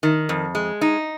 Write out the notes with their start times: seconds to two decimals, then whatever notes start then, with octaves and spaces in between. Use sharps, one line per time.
0.03 D#3
0.29 F2
0.55 G#3
0.81 D#4